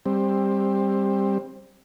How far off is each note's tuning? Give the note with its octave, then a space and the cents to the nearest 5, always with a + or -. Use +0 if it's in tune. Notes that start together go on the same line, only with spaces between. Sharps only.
G3 +15 C4 +20